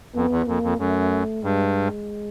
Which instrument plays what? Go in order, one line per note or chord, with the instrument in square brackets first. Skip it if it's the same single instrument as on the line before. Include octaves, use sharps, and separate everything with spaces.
[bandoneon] F2 [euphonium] B3
[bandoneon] E2
[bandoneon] F2 [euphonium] A#3
[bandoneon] F2
[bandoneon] F#2 [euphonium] A3
[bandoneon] G2 [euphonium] G#3